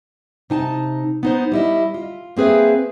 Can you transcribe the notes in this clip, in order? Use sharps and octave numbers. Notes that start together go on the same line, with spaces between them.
C3 D#4 G#5 A5
B3 D#4 C5
G3 E4 D#5
F4
A#3 C4 G#4 B4 E5